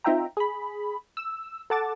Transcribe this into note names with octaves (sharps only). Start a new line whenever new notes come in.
C4 D#4 F4 E5 G5 A#5
G#4 B5
E6
A4 F#5 A5 D6 A6